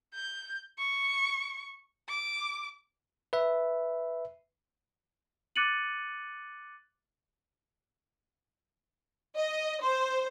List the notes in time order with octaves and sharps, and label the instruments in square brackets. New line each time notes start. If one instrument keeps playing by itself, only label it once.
[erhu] G6
C#6
D6
[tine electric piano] B4 E5
[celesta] D6 F#6 A6 C#7 D#7 F#7
[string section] D#5
C5